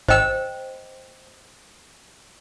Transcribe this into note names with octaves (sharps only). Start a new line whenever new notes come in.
G#1 C5 D#5 G5 E6